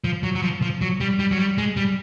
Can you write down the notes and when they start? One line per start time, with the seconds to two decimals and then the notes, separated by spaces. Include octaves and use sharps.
0.04 F3
0.23 F#3
0.35 F#3
0.42 F3
0.62 F3
0.81 F#3
1.00 G3
1.19 G3
1.32 F#3
1.38 G3
1.58 G#3
1.77 G3